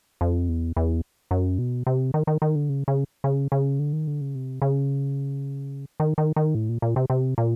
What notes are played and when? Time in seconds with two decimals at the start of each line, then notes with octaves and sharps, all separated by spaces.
0.21 F2
0.49 E2
0.77 E2
1.31 F#2
1.59 B2
1.87 C3
2.14 D#3
2.27 D#3
2.42 D#3
2.55 D3
2.69 C#3
2.88 C#3
3.24 C#3
3.52 C#3
3.79 D3
3.93 D#3
4.07 D3
4.21 C#3
4.35 C3
4.62 C#3
6.00 D#3
6.18 D#3
6.36 D#3
6.55 A2
6.69 A#2
6.82 A#2
6.96 C3
7.10 C3
7.38 A#2